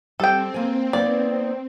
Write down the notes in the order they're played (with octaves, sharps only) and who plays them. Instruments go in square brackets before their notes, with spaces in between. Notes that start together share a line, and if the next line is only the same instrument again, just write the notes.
[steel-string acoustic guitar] G3 [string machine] C4 [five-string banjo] A4 G5
[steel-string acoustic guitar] A#3 G#5
[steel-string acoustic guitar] A#3 B3 D#4 [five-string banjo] D5